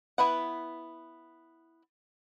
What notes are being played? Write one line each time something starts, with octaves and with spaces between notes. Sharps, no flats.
B3 E4 B4 F#5